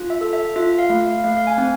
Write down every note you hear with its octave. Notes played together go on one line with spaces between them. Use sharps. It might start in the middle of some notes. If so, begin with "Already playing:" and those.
Already playing: F4
E5
A4
E5
F4 E5
F5
A3
F5
A3 F5
F5
G#5
C4